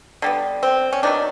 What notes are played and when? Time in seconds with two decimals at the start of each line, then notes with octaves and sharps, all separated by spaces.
0.22 D3 G3 B3
0.63 C4
0.93 C#4
1.03 D#3 F#3 B3 D4